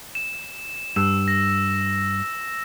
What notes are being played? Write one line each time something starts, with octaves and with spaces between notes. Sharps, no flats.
E7
G2 E6 E7
A#6